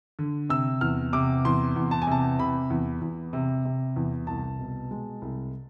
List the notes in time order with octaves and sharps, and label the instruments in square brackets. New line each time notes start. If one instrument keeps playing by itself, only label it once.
[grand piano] D3
C3 E6
E2 F6
C3 D6
E2 C6
E2
A5
G#5
C3 A5
C3 B5
E2
E2
C3
C3
E2
C2 A5
B2
G#3
C2